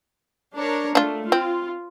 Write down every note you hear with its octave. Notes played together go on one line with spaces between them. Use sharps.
D4 A#4 C#5
A3 D4 F4
C4 F4